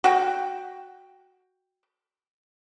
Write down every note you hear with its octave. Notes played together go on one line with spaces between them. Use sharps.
F#4 G5